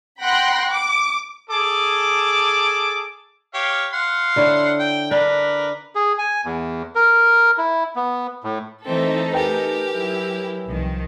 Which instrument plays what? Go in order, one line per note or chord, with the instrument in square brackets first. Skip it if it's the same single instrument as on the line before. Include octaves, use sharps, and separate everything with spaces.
[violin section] F#5 G5 B5 C6 F#6 A#6
D6
[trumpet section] G#4 A4 D6
[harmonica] G4 C#5 F5
F5 F#5 C6
[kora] D3 E4 C#5
[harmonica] G5
[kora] D4 [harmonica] A#4 B4
[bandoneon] G#4
G#5
E2
A#4
E4
B3
A2
[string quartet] E3 C4 [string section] A3 D#4 A4
[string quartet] G4 A#4 [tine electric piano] B4 G5 G#5
[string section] F#3 E4
C2 D#3 F3